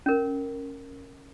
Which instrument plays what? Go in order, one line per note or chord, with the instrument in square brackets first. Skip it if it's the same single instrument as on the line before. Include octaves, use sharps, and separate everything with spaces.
[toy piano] C#4 A#4